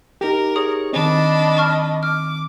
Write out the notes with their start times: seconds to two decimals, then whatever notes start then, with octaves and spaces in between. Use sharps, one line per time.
0.21 D#4 G4 A#4
0.56 G#4 C#5 D#6
0.93 D#3 C4 D4 D#5 B5
1.57 A5 C#6 F6
2.03 D6 F6